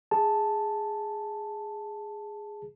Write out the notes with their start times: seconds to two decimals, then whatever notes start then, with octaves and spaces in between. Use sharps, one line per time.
0.11 G#4 A5